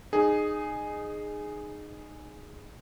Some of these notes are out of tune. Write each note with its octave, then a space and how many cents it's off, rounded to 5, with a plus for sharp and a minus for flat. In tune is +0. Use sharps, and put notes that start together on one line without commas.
D#4 -25 G#4 +0